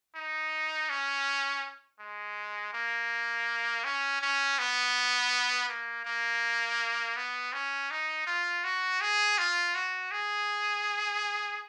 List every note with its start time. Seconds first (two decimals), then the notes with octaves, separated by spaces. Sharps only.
0.15 D#4
0.89 C#4
2.00 G#3
2.73 A#3
3.84 C#4
4.22 C#4
4.58 B3
5.69 A#3
6.05 A#3
7.17 B3
7.53 C#4
7.91 D#4
8.27 F4
8.64 F#4
9.01 G#4
9.38 F4
9.74 F#4
10.11 G#4